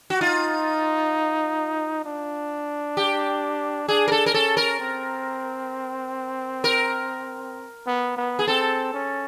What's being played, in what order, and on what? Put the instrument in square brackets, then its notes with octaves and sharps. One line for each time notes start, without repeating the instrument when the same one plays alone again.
[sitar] F#4
[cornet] D#4 [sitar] F4
[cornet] D4
[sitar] G4
[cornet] D4 [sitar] G#4
[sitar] A#4
A4
A#4
[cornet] C#4 [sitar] A4
[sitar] A#4
[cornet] C4
[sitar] A#4
[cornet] B3
B3
[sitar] G#4
[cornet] C4 [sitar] A4
[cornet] C#4